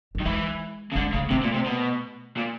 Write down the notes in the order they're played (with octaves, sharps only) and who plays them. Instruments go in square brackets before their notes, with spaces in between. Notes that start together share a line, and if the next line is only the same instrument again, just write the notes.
[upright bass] G3
[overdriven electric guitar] D#3
[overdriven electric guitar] E3 [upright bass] G#3
[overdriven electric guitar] C#3
[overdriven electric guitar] D3 [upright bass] G#3
[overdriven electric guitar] C#3 [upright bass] A3
[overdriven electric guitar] C3 [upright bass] A3
[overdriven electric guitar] A#2
C3
B2
A#2